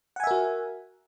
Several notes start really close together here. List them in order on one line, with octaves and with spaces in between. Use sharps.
F#5 G#5 E5 A#4 F#4